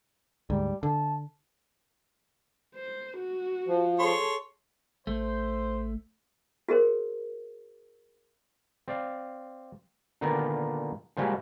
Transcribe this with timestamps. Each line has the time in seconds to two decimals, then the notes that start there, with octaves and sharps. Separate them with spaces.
0.50 D2 G#2 G3
0.83 D3 A5
2.76 C5
3.17 F#4
3.67 F3
3.99 G#4 A4 C#5 C6
5.07 A1 A3 C5
6.69 F#4 G#4 A#4 C5
8.88 C4 D5 F5
10.21 A#2 D3 D#3 B3 A#4 D5
11.17 A#2 F3 G3 G#3 F#4 G4